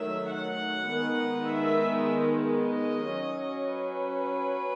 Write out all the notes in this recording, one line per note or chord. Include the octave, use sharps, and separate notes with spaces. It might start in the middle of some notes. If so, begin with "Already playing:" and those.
Already playing: D#3 F#3 A3 E5
F#5
D#3 G#3 B3
E5
D#5
F#3 C#4
B4